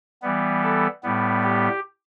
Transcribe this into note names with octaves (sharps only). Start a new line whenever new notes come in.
E3 G3 B3
A4
A2 G3 B3
G4